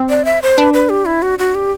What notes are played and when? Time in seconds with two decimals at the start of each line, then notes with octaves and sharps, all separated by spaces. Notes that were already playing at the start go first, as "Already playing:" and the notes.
Already playing: C4
0.09 D5
0.25 E5
0.42 C5
0.58 D4 B4
0.74 B4
0.89 G4
1.05 E4
1.22 F#4
1.39 F#4
1.55 G4